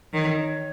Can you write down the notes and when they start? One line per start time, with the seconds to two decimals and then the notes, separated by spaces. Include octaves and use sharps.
0.13 D#3 C#5